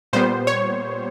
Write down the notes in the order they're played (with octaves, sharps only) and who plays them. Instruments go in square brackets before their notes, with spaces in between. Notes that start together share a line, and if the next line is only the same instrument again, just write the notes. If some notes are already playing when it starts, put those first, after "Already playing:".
[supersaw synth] A#2 G3 B3 C5
C#5